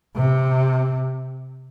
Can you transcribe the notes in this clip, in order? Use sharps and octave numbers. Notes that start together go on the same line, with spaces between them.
C3